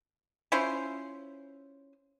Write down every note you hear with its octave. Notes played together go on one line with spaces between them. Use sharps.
C#4 E4 F4 C5